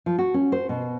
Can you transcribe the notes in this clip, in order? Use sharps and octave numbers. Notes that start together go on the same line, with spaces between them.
F3
F#4
C#4
C5
B2